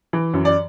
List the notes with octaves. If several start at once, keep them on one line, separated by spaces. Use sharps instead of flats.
E3
F#2
D5